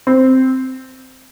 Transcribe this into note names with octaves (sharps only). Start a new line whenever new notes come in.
C4